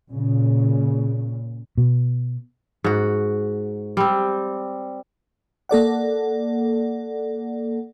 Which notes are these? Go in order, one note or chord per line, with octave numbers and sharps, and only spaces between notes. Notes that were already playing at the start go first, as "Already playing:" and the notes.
A#2 C#3
B2
G#2 F#4
G3 C4
A#3 A4 D5 F#5